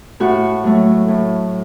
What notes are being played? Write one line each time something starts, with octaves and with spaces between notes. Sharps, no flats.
A2 F#4
F#3 A3
A2